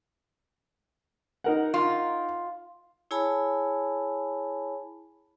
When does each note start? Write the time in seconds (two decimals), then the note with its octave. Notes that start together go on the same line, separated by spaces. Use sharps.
1.44 D#4 A#4 F#5
1.74 F4
3.11 E4 G#4 C#5 G#5 A5 B5